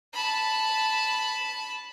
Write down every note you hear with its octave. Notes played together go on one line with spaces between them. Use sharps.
A5 B5